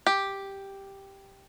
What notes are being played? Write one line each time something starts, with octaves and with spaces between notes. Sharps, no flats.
G4